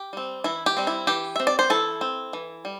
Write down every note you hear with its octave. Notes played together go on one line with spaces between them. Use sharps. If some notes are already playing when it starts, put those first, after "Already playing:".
Already playing: G4
G3 C4
E3 E4
G4
G3 C4
E4
E3 G4
C4 E5
D5
C5
E3 E4 A4
C4
E3
G3